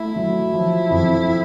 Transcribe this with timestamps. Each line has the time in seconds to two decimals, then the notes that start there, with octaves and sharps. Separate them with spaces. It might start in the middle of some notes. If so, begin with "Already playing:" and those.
Already playing: A3 E4
0.16 F#3
0.53 F3
0.91 F2